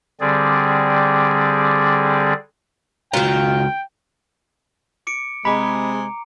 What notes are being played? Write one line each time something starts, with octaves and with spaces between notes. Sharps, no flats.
D3 G3 C4 G#4 D5
C#2 D#3 F4 F#4 G5 A#5
D6 C#7 D7
C3 G#3 A#5 B5 D6